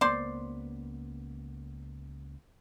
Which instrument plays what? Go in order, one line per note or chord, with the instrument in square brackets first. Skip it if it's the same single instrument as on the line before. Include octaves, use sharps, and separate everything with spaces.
[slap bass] C#2 A#3 B3 [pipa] C5 D5 C6